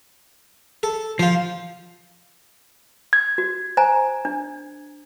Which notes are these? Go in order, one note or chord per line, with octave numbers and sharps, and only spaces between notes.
A4
F3 F4 C5
G#6
F#4
C5 G#5 A#5
D4